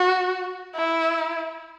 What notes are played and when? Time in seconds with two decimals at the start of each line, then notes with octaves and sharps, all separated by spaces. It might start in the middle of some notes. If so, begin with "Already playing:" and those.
Already playing: F#4
0.75 E4